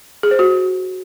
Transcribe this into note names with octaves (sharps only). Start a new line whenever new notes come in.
G#4
C5
F#4